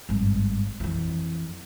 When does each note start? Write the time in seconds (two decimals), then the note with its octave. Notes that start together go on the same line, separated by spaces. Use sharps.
0.09 G#1 G2
0.80 F2 E3